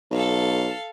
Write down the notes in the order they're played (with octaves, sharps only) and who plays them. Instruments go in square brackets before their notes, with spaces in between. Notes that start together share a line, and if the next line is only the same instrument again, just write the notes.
[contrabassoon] B1 [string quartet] A4 F5